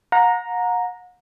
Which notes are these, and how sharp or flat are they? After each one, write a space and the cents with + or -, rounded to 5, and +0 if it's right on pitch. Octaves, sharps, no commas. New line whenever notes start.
F#5 -40 A#5 +0